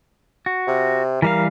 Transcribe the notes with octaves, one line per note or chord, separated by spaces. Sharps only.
F#4
C3
E3 G3 A#4 F5